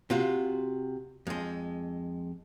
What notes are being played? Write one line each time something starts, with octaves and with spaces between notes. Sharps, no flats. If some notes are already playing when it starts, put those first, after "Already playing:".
C3 F4 F#4
F2 G#3